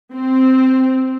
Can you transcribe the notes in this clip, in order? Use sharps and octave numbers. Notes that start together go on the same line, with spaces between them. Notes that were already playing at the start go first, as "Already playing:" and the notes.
C4